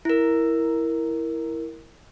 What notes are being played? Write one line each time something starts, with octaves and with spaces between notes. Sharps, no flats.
E4 A#4